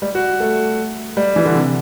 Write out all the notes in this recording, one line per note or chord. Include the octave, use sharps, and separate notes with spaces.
G3
F#4
A3
G3
E3
D3
C3